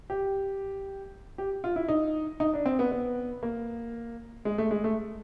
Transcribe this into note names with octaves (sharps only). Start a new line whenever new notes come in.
G4
G4
F4
E4
D#4
D#4
D4
C4
B3
B3
A#3
G#3
A3
G#3
A3